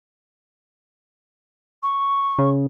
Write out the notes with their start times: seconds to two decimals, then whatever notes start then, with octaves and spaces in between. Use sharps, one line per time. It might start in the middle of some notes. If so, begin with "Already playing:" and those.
1.83 C#6
2.39 C#3